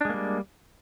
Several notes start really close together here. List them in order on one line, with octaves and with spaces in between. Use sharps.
D4 G#3 A#3 G3